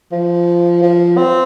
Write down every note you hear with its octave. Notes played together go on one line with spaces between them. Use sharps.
F3
F3
C4